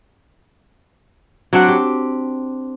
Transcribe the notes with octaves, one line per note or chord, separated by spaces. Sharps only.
F#3 C4 D4 F#5
G4